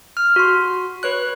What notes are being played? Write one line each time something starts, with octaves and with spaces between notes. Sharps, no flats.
F6
F#4 C6
B4 C#5 F#6